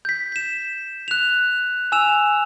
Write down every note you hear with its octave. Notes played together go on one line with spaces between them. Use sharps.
G6 B6
B6 E7
F#6 F7
G#5 E6 E7 F7